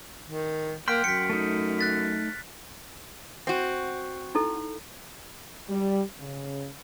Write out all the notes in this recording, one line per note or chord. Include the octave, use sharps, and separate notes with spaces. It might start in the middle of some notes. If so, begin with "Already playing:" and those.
D#3
A#3 F#5 G5 C6 F6 B6 D7
F#2 B6 C#7
A3 D#4
F#6 A6 B6
C4 F#4
D#4 E4 A4
G3
C#3